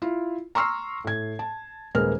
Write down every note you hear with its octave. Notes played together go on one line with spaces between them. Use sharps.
E4 F4
A#5 C6 C#6 E6 F6 C7
A2 G#6
A5
D#1 G#3 A#3 B4 F6